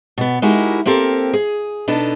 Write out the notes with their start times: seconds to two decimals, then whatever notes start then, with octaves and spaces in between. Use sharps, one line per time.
0.18 B2 B3
0.42 G#3 D#4 E4 F#4 G4 A#4
0.86 A#3 C4 G4 A4 A#4
1.33 G#4
1.87 B2 B3 D4 D#4 A4 A5